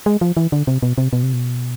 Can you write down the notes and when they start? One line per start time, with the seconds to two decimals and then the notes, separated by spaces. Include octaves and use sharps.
0.06 G#3
0.21 F3
0.37 E3
0.52 D3
0.67 C3
0.83 B2
0.98 C3
1.13 B2
1.23 C3
1.33 B2